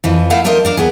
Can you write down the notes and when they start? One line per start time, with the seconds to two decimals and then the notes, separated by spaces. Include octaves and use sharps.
0.04 F2 E3 F3
0.30 A3 E4 A4 F5 F#5
0.44 F#3 A3 D4 A#4 C5 D#5
0.65 D4 A#4 D5
0.77 D#2 B3 G#4